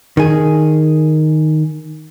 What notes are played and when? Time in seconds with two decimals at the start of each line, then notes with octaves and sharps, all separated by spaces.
0.17 D#3 G#4